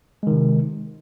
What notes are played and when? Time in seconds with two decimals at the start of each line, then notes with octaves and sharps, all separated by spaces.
0.23 G#3
0.27 D#3
0.31 C3